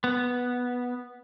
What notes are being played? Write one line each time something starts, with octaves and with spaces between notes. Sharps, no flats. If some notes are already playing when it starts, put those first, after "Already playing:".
B3